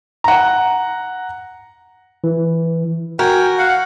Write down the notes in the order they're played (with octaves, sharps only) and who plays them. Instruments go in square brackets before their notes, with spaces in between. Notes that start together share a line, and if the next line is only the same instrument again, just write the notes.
[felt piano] F#5 A#5
[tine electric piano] E3
[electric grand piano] F#4 [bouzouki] A#4 [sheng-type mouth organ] G5 G#5
[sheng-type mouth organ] F5 [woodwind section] F#5